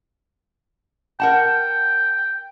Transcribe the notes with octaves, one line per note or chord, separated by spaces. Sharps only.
A#4 F#5 G5 A5